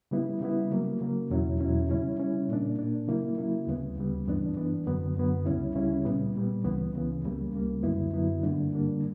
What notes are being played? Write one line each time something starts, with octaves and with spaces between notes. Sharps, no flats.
C#3 G3 B3 E4
C#3 G3 B3 E4
C#3 F#3 A#3
C#3 F#3 A#3
E2 B2 F#3 C#4 E4
E2 B2 F#3 C#4 E4
C#3 G3 C#4 E4
C#3 G3 C#4 E4
A#2 A#3 D4
A#2 A#3 D4
C#3 F#3 A#3 E4
C#3 F#3 A#3 E4
D2 C#3 G3 B3
D2 C#3 G3 B3
G2 E3 B3 D4
G2 E3 B3 D4
F#2 D3 F#3 B3
F#2 D3 F#3 B3
C#2 C#3 G3 C#4 E4
C#2 C#3 G3 C#4 E4
A#2 G3 B3
A#2 G3 B3
C#2 C#3 E3 B3
C#2 C#3 E3 B3
C#2 C#3 G3 A#3
C#2 C#3 G3 A#3
F#2 D3 F#3 B3 E4
F#2 D3 F#3 B3 E4
G2 D3 G3 A#3 D4
G2 D3 G3 A#3 D4